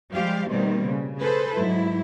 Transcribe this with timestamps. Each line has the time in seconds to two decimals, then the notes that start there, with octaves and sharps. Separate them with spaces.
0.12 F3 G3 G#3 G4 C5 F5
0.50 B2 D#3 G3 A3 A#3 C4
0.86 C#3
1.20 G#4 A4 B4 C5
1.57 G#2 F#3 E4